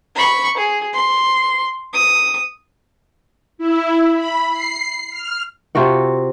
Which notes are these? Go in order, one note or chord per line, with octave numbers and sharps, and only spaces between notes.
B5 C#6
G#4
C6
D#6
E4
B5
C7
F6
C3 F4 F#4 F#5